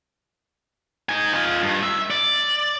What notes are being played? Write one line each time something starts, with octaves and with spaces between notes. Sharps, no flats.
D#4 G#5
F4 D#5
G2
E5
D5